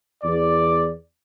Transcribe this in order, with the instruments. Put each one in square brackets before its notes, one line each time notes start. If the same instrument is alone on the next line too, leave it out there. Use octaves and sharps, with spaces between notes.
[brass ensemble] E2 D5